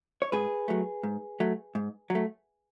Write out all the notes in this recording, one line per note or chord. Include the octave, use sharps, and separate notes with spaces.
C#5
G#2 G#4 B4
F#3 A3
G#2
F#3 A3
G#2
F#3
A3